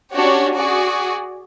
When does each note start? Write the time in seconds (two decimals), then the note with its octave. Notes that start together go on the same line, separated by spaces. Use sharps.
0.13 C#4 D4 F#4 G4 C#5
0.55 F#4 G#4 D5